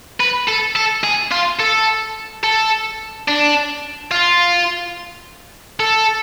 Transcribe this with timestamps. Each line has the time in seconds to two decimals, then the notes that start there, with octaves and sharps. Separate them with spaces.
0.20 B4
0.48 A4
0.76 A4
1.04 G#4
1.31 F4
1.59 A4
2.44 A4
3.28 D4
4.11 F4
5.80 A4